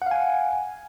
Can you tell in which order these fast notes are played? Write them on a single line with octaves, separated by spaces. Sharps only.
F#5 F5 G#5